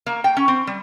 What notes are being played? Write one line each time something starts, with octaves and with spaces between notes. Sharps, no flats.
A#3
G5
C#4
C4
G3